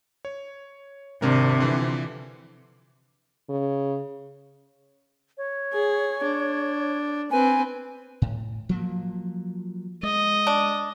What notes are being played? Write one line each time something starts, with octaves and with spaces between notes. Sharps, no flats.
C#5
G#1 C3 D4 A#4
D3 E3 F3
C#3
C#5
G#4
D4
C4 B4 G#5
A2
F3 F#3 A#3
G#3 D#5
D4